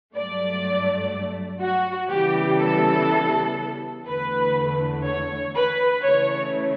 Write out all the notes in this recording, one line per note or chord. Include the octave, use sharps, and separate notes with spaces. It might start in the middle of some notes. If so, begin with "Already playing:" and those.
G2 F#3 A3 D5
F#4
C#3 E3 G3 B3 G4
A4
E2 D3 A3 B4
C#5
B4
C#3 E3 A3 C#5